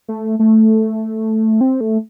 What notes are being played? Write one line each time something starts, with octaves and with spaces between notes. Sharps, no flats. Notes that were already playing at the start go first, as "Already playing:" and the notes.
A3
A3
C4
A3